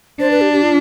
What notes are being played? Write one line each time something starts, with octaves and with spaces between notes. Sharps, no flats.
D4 C5
B4
G4
G4
F4